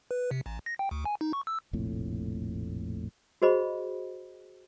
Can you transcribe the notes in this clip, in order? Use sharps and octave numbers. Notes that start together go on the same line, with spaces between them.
B4
C3
A1
A#6
G5
D2
G#5
D#4
C#6
E6
F1 A#1 F2 A2
F#4 G#4 C5 D#5 B5